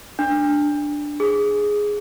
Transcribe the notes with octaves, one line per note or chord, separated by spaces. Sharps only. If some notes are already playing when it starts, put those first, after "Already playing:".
D4
G#4